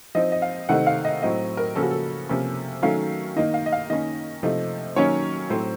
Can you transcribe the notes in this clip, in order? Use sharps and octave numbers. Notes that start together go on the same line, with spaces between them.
F3 C4 D#4 D#5
D#5
F5
C3 D#3 A3 C4 D#4 F#5
F5
D#5
A2 F#3 C4 D#5
A#4
C#3 F3 A#3 C#4 A4
F#4
A4
C3 F3 A#3 C#4
D#3 F#3 A3 C#4 F5
D#3 A#3 D#4 D#5
F5
D#5
F5
D#3 A#3 C#4 D#5
C3 F3 A3 D#4
D#3 F#3 A#3 C#4 C#5
A2 F#3 A3 C4 C5